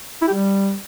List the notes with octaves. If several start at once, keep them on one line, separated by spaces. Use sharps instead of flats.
E4
G4
G3